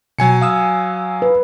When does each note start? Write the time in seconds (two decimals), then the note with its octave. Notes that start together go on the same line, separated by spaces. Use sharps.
0.19 B2 F#3 G#5 C#7
0.42 F5 D#6 E6
1.22 B4